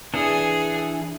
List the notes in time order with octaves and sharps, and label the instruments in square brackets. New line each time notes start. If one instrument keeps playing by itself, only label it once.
[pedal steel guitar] E3 D4 A4 [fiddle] G#4